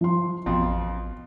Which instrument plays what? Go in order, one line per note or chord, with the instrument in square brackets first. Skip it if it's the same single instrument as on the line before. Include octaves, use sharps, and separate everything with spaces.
[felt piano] F3 C6
[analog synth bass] A1 [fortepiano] F2 B2 [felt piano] C6